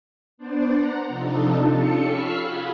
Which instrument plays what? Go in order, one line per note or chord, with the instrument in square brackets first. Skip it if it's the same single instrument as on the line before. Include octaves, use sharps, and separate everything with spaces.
[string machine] B3 D4 C5 D5
F#5 A#5
C3 F3 D4 D#4 F4 A4
C#4 F4 G4 A4 C#7
B5 C#6 E6 F6 B6 C7
F4 F#4 G#4 B5